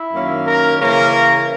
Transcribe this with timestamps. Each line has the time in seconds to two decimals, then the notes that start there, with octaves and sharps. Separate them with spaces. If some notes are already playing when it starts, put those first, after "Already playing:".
Already playing: E4
0.13 F#2 D#3 A#3 C#4
0.46 A#4
0.78 C#3 E3 A#3 C#4 A#4